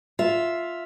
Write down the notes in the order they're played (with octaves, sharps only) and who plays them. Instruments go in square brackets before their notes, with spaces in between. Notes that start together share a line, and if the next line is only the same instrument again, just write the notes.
[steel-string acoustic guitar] F4 E5